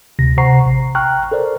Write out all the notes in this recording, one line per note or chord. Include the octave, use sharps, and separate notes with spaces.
D2 C3 A#6
C3 C5 F#5 A#5 C#6 C7
A1
G5 A#5 C#6 F6 F#6
A4 A#4 C5 D5